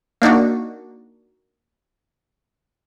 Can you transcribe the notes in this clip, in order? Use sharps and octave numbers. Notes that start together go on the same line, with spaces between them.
A#3 D4 D#4 F#4